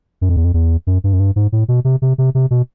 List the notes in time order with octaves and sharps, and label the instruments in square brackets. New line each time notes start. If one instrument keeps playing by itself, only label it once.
[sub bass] F#2
F2
E2
F2
E2
F#2
G2
F#2
G2
G#2
A2
B2
C3
C3
C3
C3
B2